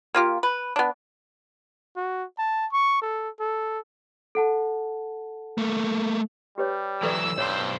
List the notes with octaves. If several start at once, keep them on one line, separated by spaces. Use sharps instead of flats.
A#3 F4 G4
B4
B3 D4
F#4
A5
C#6
A4
A4
A4 F#5 A5
A3 A#3
G3 G4 B4 C#5
E3 F#3 A4 B4 D5 E6
B1 G2 C5 C#5